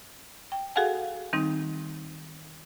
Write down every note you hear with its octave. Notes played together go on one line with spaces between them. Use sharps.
G5
F#4 G#4 A4 F5 F#5 G#5
D#3 G3 C4 D#4